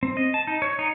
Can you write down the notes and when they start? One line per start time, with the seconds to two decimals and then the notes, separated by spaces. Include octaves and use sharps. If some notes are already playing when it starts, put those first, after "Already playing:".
0.03 C4
0.17 D#5
0.34 A5
0.47 D#4
0.62 C#5
0.79 D#4